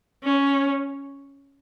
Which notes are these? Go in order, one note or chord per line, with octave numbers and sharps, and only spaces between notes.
C#4